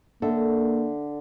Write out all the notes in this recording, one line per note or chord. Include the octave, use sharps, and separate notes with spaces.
D3 A#3 A4 E5